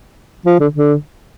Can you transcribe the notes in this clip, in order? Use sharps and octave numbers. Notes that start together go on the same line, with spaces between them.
F3
D3
D3